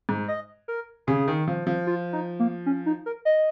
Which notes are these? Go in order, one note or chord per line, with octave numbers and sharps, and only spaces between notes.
G#2
D#5
A#4
C#3 G#4
D#3
F3
F3
F4
D#4
A#3
C#4
D#4
A#4
D#5